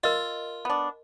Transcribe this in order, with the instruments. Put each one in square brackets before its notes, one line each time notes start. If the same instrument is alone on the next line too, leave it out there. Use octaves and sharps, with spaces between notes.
[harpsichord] F4 [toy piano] A#4 D#5
[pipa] B3 D4